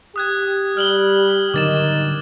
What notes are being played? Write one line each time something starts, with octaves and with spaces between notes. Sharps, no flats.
G4 D#6 F#6 G#6
G3 F6 F#7 G7
D3 D#3 F#3 G3 D6 A6 E7